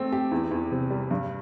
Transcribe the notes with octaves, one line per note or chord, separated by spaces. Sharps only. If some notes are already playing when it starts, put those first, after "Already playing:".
Already playing: A3 C4
G4
E2
E2
C3
G3
G2